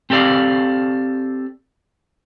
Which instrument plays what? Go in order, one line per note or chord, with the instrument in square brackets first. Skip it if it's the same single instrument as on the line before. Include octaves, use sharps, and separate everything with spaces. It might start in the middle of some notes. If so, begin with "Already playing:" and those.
[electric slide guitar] C4 G4 A4 D5 F5